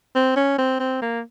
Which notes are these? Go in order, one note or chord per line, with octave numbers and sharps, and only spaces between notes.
C4
C#4
C4
C4
A#3